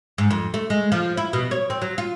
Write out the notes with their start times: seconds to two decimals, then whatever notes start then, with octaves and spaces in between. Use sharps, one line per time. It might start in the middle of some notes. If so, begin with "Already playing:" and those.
0.18 G#2
0.31 F2
0.54 A3
0.70 G#3
0.92 F3
1.17 E4
1.33 B2
1.51 C#5
1.70 C4
1.82 F#3
1.98 F4